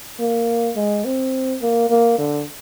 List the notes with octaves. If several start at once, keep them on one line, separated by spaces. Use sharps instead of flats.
A#3
G#3
C4
A#3
A#3
D3